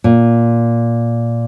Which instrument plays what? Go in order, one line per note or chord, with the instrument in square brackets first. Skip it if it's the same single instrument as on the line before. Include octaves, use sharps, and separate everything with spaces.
[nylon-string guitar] A#2